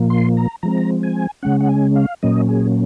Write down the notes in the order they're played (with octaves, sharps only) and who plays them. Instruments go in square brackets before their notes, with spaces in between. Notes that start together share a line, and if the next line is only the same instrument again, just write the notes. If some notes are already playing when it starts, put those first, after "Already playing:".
Already playing: [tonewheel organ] A#2 F3 A#3
C6
A#5
F3 G#3 C4 A#5
G#5
C#3 G#3 C#4 F#5
F#5
G#5
F5
A#2 F#3 A#3 C#4 D#5
G#4